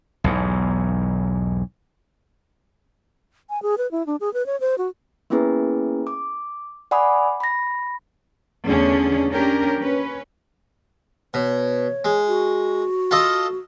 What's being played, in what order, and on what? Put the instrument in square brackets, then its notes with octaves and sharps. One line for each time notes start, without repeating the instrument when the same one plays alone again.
[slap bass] B1 E2 G#2
[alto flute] G#5
G#4
B4
E4
D4
G#4
B4
C#5
C5
F#4
[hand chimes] A#3 B3 C#4 E4 G#4 B4
D6
D5 F#5 G#5 B5 D6 D#6
B5 A#6
[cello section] E2 D3 A3 C#4 D4 G#4
A#3 C#4 D4 G4 A#4
C#4 B4
[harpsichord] B2 [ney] C#5
[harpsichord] G#3
[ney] F#4
[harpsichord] F4 A4 D#5